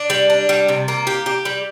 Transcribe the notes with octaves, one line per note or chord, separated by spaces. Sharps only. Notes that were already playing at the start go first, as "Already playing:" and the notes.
Already playing: D4
G3
D4
G3
C3
A#3
G4
G4
G3